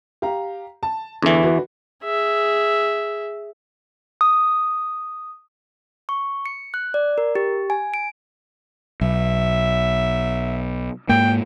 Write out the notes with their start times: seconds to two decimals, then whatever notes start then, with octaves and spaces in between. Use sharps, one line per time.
0.22 G4 F5 A#5
0.83 A5
1.22 E2 D3 E3 A4
1.43 F#4 B4
2.04 G#4 E5
4.21 D#6
6.09 C#6
6.46 C#7
6.74 F#6
6.94 D5
7.18 A#4
7.35 G4
7.70 G#5
7.94 D7
9.01 B1 E5
11.09 G#2 A#3 G5